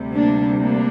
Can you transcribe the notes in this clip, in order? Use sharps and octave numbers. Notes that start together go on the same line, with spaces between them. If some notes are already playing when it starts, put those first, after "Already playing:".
Already playing: D2 C3 G3
A#3 D4
A#3 D4